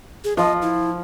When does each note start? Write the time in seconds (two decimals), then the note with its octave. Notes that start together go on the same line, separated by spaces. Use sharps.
0.24 G#4
0.37 F3 D#5
0.62 E4